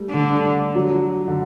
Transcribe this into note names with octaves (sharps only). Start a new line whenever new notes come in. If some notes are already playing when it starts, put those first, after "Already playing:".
Already playing: G3 A3
D3
F#3
D3